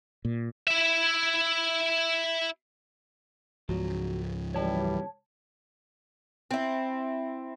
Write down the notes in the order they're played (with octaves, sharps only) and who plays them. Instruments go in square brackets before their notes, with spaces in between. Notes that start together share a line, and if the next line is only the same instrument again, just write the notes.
[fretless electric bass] A#2
[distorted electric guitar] E4 E5
[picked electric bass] C#2 G#2 F3 [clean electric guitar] F#3
[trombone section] F#2 E3 G3 [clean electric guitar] C#5 A5
[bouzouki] C4 E4